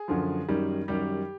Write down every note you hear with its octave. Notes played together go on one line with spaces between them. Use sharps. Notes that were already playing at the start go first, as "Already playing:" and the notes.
Already playing: G#4
F#2 D3 F3
F#2 D#3 G3
F#2 D#3 G3 G4